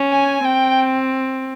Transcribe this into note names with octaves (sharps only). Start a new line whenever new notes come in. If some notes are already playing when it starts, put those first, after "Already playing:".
Already playing: C#4
G#5
C4 G5